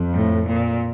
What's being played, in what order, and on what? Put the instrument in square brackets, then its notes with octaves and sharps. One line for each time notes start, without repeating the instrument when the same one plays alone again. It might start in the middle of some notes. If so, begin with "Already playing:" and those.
Already playing: [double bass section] F2
[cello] A2
A#2